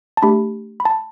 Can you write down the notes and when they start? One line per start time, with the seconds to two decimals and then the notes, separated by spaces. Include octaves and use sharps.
0.17 A5
0.22 A3 D4 G4 B5
0.80 B5
0.85 A5